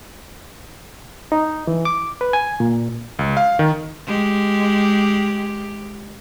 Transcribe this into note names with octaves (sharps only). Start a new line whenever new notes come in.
D#4
E3
D6
B4
G#5
A#2
C#2
F5
D#3
G#3 G4